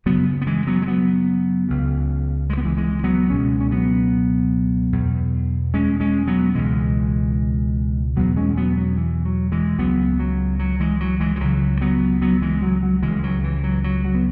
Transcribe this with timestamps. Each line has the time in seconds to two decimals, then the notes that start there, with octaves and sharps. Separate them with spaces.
0.06 F#2 C#3 F#3 B3
0.42 B3
0.47 E3 G#3
0.67 F#3 B3
0.82 G#3
0.87 F#3 B3
1.69 C#2 C#3
2.50 G#3
2.58 B3
2.65 E3 G#3
2.77 E3 G#3
3.04 F#3 B3
3.30 C#2 B2 G#3 C#4
3.60 C#4
3.71 F#3 B3
4.92 E2 B2
5.74 G#3 C#4
6.00 G#3 C#4
6.27 F#3 B3
6.55 C#2 B2 E3 G#3
8.16 E2 B2 F#3 B3
8.36 G#3 C#4
8.57 F#3 B3
8.77 F#3
8.97 E3
9.25 F#3
9.52 E3 G#3
9.78 C#2 C#3 F#3 B3
10.19 F#3
10.59 F#3
10.80 E3 G#3
11.00 F#3
11.20 E3 G#3
11.36 E3
11.40 C#2 C#3 F#3
11.81 F#3 B3
12.22 F#3 B3
12.42 E3 G#3
12.62 F#3
12.83 F#3
13.03 C#2 C#3 E3 G#3
13.24 F#3
13.44 E3
13.63 F#3
13.84 F#3
14.04 F#3
14.15 B3